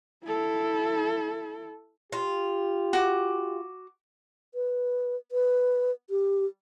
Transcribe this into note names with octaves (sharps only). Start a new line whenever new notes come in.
E4 A4
F4 G4
F#4 D6
B4
B4
G4